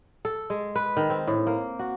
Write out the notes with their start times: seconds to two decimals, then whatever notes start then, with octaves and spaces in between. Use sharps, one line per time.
0.25 A4
0.50 G#3
0.76 B4
0.97 D#3
1.10 C4
1.27 A2
1.47 A#3
1.79 F#4